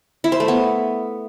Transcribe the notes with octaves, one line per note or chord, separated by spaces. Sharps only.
E4
C5
A3
B3